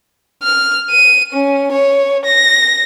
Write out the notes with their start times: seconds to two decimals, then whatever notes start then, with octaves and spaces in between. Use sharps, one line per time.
0.43 F6
0.91 D#7
1.33 C#4
1.72 C#5
2.25 A#6